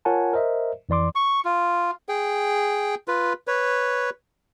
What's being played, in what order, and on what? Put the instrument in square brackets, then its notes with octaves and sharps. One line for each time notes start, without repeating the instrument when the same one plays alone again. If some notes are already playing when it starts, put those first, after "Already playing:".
[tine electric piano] F4 A#4 C#5 F#5 G#5 A5
A#4 C5 D#5 E5
F2 E3 D5 C6 D6
[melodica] C#6
F4
G#4 G5
F4 B4
B4 C#5